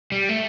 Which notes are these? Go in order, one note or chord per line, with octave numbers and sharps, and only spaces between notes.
G3
A3